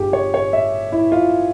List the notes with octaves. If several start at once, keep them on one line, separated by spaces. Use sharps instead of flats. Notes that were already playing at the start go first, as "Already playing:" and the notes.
Already playing: G1 G2 F3 G4 G#4
C#5
C#5
E5
E4
F4